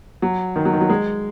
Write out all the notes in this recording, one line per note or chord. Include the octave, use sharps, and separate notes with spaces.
F#3
D#3
F#3
D#3
F#3
G#3